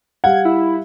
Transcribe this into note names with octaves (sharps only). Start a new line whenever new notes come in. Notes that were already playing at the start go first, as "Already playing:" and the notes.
G3 F5 F#5 G#6
E4